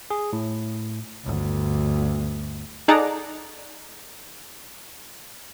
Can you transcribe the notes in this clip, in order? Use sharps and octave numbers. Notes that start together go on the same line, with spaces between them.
G#4
A2
G1 D2
D#4 G#4 A4 D5 F#5 A#5